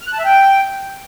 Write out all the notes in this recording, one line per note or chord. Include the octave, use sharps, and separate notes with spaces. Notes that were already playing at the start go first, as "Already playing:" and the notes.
F6
F#6
A5
E5
G5